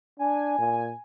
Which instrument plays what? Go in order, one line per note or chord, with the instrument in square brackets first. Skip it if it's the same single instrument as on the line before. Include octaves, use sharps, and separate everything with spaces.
[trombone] D4 [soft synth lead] G#5
[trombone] A#2